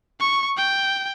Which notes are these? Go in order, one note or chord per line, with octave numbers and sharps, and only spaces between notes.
C#6
G5